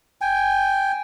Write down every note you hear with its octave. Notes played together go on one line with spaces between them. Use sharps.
G5 G#5